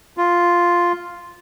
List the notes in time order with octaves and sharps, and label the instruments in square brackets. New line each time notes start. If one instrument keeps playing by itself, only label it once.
[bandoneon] F4